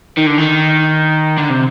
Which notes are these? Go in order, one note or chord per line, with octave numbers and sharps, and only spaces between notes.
D#3
D3
D#3
D3
C3